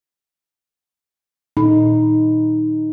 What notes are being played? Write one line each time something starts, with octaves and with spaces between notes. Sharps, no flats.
A#2 D#4